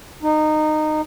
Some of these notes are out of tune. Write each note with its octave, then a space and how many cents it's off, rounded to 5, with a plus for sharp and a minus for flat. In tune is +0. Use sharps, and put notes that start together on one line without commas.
D#4 -20